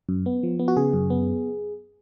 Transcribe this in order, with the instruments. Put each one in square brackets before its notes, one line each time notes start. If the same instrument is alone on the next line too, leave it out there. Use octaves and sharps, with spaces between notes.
[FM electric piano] F#2
B3
F3
B3
F#4
C#3 G#4
F#2
B3